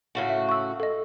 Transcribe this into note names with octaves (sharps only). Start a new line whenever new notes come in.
A2 C#3 F#4
E5
C#6 E6
A4 D#5